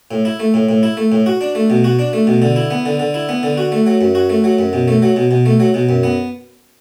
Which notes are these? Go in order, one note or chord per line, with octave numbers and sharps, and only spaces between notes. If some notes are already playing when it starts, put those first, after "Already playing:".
A2
E4
A3
A2
A2
E4
A3
A2
F#4
D4
A3
B2
F#4
D4
A3
B2
D3
E4
B3
D3
D3
E4
B3
D3
F#4
A3
F#3
F#2
F#4
A3
F#3
F#2
B2
A3
F#3
B2
B2
A3
F#3
B2
F#2
B3